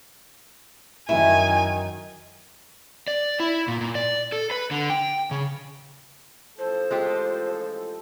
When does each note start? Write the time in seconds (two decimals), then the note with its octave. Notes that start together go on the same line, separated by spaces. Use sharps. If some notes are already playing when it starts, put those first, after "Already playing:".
1.09 F#2 D#3 E4 G#5
3.08 D5
3.40 E4
3.68 A#2
3.81 A#2
3.95 D5
4.32 A4
4.51 B4
4.71 D3
4.90 G5
5.31 C#3
6.59 A1 F3 A4 C5
6.91 G#3 F4 G4